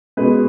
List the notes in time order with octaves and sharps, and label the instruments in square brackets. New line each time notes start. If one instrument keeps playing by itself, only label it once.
[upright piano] B2 G#3 B4